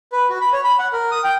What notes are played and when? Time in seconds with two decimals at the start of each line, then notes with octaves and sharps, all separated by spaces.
0.12 B4
0.30 F#4
0.41 B5
0.53 C#5
0.64 B5
0.79 F#5
0.93 A#4
1.11 D#6
1.24 G5